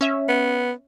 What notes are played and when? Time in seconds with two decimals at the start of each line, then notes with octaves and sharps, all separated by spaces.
0.01 C#4 E5
0.29 B3